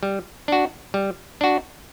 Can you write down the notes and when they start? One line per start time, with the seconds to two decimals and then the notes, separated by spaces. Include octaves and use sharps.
0.03 G3
0.48 D4 F#4
0.94 G3
1.41 D4 F#4